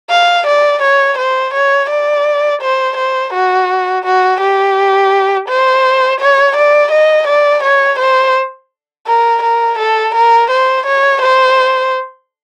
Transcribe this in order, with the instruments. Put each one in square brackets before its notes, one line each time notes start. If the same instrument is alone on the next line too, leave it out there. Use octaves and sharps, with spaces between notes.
[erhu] F5
D5
C#5
C5
C#5
D5
C5
C5
F#4
F#4
G4
C5
C#5
D5
D#5
D5
C#5
C5
A#4
A#4
A4
A#4
C5
C#5
C5